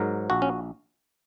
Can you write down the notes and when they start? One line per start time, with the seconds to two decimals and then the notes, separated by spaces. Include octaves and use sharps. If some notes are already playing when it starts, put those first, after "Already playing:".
Already playing: G#2 F#3 A#4
0.30 A#1 F#4
0.42 C#4